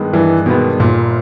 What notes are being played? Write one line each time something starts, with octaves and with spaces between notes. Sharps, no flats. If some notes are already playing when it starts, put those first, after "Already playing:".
Already playing: G2 D#3 G#3 B3
G2 E3
B2 D#3 G#3 B3
G1 A#2